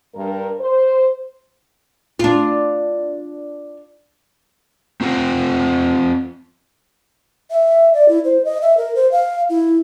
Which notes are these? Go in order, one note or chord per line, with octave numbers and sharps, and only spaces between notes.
G2 A#4
C5
D4 F4
C4 F4 C5 F#5 G5
E5
D5
E4
C5
D#5
E5
A#4
C5
F5
E4